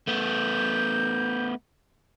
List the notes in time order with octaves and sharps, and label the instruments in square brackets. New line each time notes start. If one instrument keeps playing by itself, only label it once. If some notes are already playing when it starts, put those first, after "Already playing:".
[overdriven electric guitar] A3 B3 [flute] G6